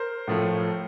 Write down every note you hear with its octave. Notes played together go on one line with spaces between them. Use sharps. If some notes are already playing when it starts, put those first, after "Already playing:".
Already playing: A#4 C5
A2 F3 A3